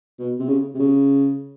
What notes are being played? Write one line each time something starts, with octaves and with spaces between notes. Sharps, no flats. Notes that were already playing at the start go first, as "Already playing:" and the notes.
B2
C3
C#3
C3
C#3